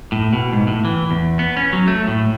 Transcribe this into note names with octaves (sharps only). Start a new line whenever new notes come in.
A2
B2
G#2
A2
E3
E2
B3
C#4
F#3
A3
A2